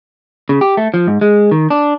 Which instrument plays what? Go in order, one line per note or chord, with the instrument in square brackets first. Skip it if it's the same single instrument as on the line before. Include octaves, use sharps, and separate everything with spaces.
[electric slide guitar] C#3
G4
A3
F3
G#2
G#3
D#3
D4